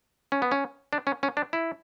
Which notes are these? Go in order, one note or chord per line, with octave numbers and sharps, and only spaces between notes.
C#4
B3
C#4
D4
C#4
C#4
D4
E4